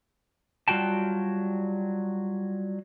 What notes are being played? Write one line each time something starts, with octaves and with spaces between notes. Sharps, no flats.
F#3 G3 F4 F#4 G5 A5